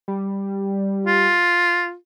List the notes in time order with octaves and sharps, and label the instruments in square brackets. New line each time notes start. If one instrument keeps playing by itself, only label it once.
[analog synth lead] G3
[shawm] F4